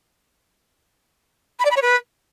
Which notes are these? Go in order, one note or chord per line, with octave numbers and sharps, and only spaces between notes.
B5
D5
B5
C#5
B4